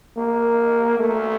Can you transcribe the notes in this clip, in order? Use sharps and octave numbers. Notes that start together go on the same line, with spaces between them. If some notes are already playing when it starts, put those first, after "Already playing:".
A#3
A3